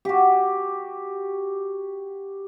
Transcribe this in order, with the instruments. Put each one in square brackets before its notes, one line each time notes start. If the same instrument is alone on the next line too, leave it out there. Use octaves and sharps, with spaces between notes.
[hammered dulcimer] F#4 G4